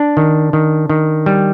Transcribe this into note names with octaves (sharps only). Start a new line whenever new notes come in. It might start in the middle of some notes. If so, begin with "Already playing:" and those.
Already playing: D4
D#3
D#3
D#3
G3